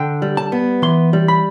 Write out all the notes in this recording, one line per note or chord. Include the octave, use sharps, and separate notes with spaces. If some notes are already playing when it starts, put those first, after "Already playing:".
Already playing: D3 G5
G3
A5
B3
E3 C6
G3
B5